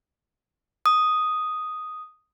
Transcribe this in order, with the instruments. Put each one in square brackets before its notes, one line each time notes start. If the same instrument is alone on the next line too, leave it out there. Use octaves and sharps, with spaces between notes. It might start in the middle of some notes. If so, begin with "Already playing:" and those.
[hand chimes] D#6